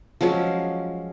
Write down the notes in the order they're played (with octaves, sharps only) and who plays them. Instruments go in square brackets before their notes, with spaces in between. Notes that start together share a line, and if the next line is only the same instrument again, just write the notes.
[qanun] F3 F#3 G#3 C#4